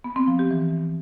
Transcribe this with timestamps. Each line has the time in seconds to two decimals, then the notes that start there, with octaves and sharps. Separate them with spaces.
0.04 B3
0.16 C4
0.28 F3
0.39 G4
0.51 E3